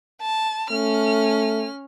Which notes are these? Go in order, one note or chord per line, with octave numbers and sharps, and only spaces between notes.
A5
A3 C#4 F6